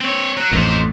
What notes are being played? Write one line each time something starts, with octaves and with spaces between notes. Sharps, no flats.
C4 C#5
F#3 F#4
A1 F2 A2 D#4 C5